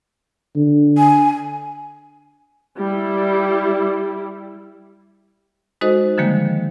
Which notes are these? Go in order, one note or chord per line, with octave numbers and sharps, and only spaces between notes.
D3
G#5
G3 E4
G#3 D#4 F#4 A4 C5 D#5
D3 D#3 F3 G3 G#3 A#3